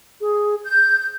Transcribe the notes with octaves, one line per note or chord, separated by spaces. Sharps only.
G#4
G6